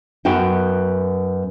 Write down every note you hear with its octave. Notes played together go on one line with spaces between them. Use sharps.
F#2 B3 F#4 G5